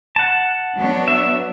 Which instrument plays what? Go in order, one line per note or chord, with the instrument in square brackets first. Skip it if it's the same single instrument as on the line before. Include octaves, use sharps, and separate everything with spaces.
[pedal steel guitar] F#5 A5
[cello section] F#3 B3 D4
[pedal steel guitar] E5